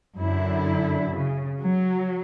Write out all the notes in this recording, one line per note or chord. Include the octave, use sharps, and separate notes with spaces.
F#2 D3 E4
C#3
F#3